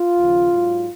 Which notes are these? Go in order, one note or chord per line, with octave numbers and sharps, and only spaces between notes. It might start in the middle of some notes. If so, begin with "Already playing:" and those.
Already playing: F4
D#2 C#3 F3
G#2 F#3